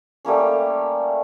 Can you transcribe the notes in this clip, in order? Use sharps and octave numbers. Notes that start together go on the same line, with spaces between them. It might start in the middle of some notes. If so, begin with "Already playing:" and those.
G3 A3 A#3 C#4